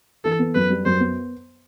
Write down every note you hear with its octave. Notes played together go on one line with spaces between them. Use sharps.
E3 A4
B3
F#2 B4
G3
F#2 C5
B3